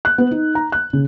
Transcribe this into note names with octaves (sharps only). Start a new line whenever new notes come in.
F#6
B3
D#4
A#5
F#6
C#3